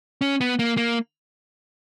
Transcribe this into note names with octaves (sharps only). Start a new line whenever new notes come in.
C#4
B3
A#3
A#3